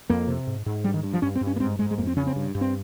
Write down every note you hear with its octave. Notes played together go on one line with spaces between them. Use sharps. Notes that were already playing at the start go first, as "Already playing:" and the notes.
F2 A#3
C3
G#2
G#2
G2 G3
D#3
G2
F3
G2 C#4
C4
G2
C#4
A#3
G#2 C4
G#2 G#3
G#3
F2 A#3
C4
C#3 C#4
C4
G2
G2
C4